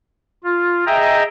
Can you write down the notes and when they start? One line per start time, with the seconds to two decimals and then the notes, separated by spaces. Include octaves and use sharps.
0.44 F4
0.86 G#4 D#5 E5 G5 A#5